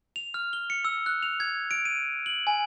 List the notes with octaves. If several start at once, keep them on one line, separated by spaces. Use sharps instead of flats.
F7
F6
G7
C#7
E6
F#6
F7
G#6
D7
D#7
F#7
G#5